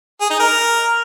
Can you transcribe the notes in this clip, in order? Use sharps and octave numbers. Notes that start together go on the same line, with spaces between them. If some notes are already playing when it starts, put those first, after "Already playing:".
G#4
D#4
A#4